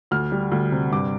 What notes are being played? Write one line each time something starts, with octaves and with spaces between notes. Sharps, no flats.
D2 F6
G3
D2
C3
G2 D6